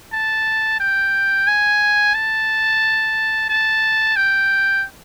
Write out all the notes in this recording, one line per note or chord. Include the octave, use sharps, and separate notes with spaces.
A5
G5
G#5
A5
A5
G5